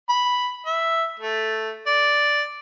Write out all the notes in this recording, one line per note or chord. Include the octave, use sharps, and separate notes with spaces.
B5
E5
A3
D5